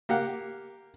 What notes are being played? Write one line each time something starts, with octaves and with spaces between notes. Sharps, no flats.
A#3 G4 F#5